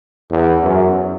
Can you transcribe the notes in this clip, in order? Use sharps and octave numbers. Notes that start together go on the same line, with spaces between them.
E2
F#2